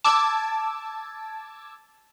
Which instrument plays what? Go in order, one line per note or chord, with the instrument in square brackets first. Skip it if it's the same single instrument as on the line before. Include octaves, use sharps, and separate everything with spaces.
[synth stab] A5 D6 E6 G#6